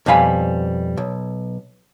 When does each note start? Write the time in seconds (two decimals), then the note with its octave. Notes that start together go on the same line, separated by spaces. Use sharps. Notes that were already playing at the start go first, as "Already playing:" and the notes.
0.06 F2 B2 G3 F5 G#5 B5
0.97 B1